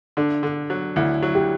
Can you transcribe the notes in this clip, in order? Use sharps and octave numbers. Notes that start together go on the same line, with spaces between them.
D3 D4
D3
F#3
D2 E4
F#3
G4